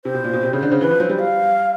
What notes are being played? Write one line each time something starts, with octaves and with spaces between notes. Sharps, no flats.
C3 C5
B2
A#2
B2
C3
C#3
D3
C#3
E3 B4
F3
F#3 C5
G3
F5